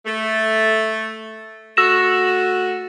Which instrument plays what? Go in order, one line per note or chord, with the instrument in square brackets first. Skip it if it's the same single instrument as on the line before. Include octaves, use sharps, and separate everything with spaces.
[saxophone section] A3
[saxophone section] A3 F#4 [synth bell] E6 A#6 E7